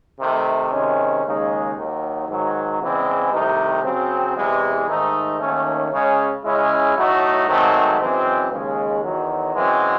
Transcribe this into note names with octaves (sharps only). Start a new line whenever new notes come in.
C3 D#3 A3
C3 D#3 G#3 C#4
D#2 C#3 G#3 D#4
D#2 D#3 F#3
G#2 D#3 F#3
E2 C#3 E3 G#3 C4
C2 C3 D#3 A3 D#4
C#3 F#3 C4
E2 C3 E3 G#3
G#2 D#3 A3 D#4
D#2 D#3 A3 C#4
C#3 G#3 C#4
C#3 G#3 C#4 E4
A2 F#3 A3 D#4 F#4
G#2 D#3 F#3 A3 C4
F#2 E3 G#3 C4
D#2 C#3 G#3
E2 D#3 F#3
F#2 E3 G#3 C4 F#4